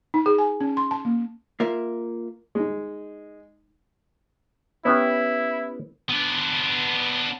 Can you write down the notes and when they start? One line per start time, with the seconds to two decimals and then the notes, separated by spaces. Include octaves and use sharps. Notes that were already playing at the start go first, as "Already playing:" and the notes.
0.14 D#4
0.26 G#4
0.38 G#5
0.61 C#4
0.77 C6
0.91 A5
1.05 A#3
1.60 A#3 F4 A#4 E5
2.55 G#3 D#4
4.85 B3 C#4 E4 G4
6.09 B3 D4